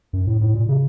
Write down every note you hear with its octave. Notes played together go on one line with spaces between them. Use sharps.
F#2
A2
A2
A#2
C#3